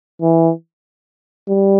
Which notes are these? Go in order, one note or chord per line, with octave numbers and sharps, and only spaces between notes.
E3
G3